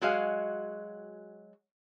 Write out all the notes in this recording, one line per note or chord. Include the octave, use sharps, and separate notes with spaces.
F#3 G#3 F#4 G#4 D#5 F5